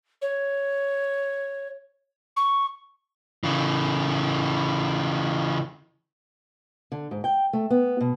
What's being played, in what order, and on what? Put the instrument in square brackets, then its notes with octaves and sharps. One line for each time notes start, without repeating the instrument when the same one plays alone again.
[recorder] C#5
C#6
[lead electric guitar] C#3 E3
[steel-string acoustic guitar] D3
G#2
G5
A3
B3
B2